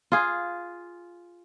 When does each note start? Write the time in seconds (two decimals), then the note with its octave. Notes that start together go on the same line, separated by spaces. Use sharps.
0.12 F4 G#4